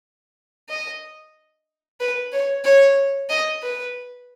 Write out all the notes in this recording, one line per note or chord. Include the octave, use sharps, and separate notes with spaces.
D#5
B4
C#5
C#5
D#5
B4